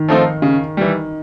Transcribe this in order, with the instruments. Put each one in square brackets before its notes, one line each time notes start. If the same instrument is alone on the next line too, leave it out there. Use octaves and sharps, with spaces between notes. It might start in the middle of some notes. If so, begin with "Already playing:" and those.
Already playing: [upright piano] D#3
[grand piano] F3 A3 C4 D#4
C#3
E3 G3